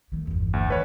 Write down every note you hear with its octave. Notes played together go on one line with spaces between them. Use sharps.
D#3 A3
G1 E2
D2
D#3 B4 C#5